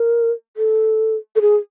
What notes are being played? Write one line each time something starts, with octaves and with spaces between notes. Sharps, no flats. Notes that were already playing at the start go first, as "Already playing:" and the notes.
Already playing: A#4
A4
A4
G#4